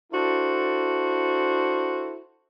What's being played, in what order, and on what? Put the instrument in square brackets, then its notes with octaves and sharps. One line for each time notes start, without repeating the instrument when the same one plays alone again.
[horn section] D4 E4 F#4 A4 C5